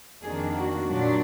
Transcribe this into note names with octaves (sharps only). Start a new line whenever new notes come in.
F2 D#3 A#3 D4 G#4
F#4
A#2 F#3 D4